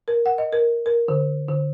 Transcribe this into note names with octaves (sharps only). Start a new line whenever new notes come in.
A#4
F#5
D#5
A#4
A#4
D3
D3